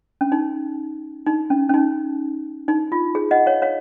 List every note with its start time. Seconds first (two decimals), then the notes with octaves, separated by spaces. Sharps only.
0.21 C#4
0.32 D#4
1.26 D#4
1.50 C#4
1.69 C#4
1.74 D#4
2.68 D#4
2.92 F4
3.15 G#4
3.31 D#5 F#5
3.46 C#5 F5
3.62 C#5 F5